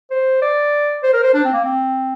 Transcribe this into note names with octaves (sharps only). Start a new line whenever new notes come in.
C5
D5
C5
A#4
C5
D4
C4
A#3
C4